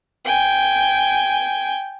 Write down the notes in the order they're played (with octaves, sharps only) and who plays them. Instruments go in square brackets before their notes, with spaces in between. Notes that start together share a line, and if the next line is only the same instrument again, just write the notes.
[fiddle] G5 G#5